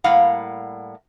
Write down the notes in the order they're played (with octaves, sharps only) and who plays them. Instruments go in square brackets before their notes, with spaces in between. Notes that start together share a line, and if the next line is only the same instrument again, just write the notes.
[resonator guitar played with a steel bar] A2 G3 A#3 F5 F#5